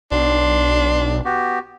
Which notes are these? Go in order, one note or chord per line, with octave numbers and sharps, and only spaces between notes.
B1 D4 C6
B3 F#4 G4